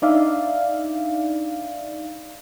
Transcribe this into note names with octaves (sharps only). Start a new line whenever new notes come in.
D4 D#4 D5 E5 F5